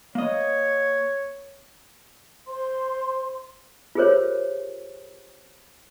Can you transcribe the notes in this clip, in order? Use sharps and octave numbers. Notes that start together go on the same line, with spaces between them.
A#3 C#5 D#5
C5 C6
F4 G4 G#4 A#4 C5 C#5